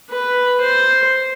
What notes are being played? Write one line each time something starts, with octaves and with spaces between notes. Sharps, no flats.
B4
C5